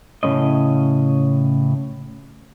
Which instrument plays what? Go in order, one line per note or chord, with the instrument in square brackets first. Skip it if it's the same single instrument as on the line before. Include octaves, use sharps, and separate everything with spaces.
[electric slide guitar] A2 C#3 G#3 C#4 D#5